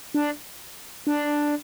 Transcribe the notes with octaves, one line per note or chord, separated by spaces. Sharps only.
D4
D4